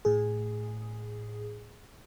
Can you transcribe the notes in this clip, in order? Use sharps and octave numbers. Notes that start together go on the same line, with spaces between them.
A2 G#4